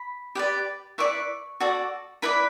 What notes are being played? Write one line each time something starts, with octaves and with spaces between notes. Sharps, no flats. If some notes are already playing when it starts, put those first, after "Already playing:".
Already playing: B5
G4 B4 D5
E4 B4 D5 C#6
F#4 A4 D5
E4 B4 D5 B5